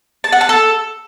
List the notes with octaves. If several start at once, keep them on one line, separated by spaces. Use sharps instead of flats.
A5
F#5
A5
A4